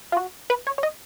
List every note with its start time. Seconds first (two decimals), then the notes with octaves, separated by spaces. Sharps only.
0.12 F4
0.17 F#4
0.50 B4
0.67 C#5
0.78 C#5
0.83 D#5